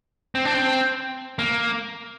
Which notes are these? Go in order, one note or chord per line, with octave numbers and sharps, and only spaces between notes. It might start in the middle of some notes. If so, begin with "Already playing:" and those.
C4
D4
C4
A#3